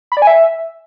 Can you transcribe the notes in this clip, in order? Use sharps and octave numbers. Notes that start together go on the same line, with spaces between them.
B5
D5
G#5
E5